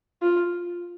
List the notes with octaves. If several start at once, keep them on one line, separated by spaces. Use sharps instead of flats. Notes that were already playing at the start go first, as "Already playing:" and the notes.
F4